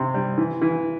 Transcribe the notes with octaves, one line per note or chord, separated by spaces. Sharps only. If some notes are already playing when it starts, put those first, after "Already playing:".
Already playing: C3
G3
E3
E3